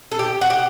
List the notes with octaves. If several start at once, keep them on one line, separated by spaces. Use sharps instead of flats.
A4
G4
F#4
G4